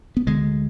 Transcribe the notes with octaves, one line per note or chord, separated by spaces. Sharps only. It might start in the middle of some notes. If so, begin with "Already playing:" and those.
B3
D2 D3 G#3